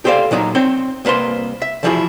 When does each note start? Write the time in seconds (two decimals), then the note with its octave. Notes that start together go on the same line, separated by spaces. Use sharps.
0.05 G4 A4 C5 D5 F5
0.31 A#2 F#3 D#4 A#5
0.55 C4 C#5 G5
1.05 C2 A#3 B4 C5 C6
1.62 E5
1.83 D3 E3 F3 E4 F#4 G#4